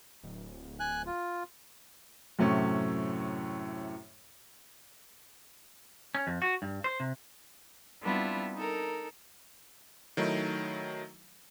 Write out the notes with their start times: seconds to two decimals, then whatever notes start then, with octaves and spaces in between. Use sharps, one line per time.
0.23 D1
0.80 G#5 F#6
1.06 F4
2.39 F#2 A2 C3 A3 C#4
6.15 C#4
6.27 F2
6.42 F#4
6.62 G2
6.84 C5
7.00 C3
8.01 G3 B3 C4 D4 E4 F4
8.55 D#4 A4 A#4
10.17 D#3 F#3 A3 D#4 E4